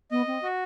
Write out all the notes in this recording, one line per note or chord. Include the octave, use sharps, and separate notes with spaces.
B3 D#5
C4
F#4